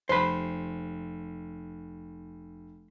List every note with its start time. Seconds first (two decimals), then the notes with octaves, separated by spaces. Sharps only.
0.09 F1 C5 B5